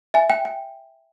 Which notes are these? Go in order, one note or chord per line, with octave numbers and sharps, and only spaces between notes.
E5 G#5
G5
G5